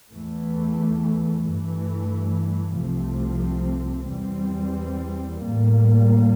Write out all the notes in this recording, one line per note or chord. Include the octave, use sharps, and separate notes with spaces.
E2 E3 A3
G2 E3 A3
C2 C3 F3 A3 C4
E2 E3 G3 C4
A2 G3 A#3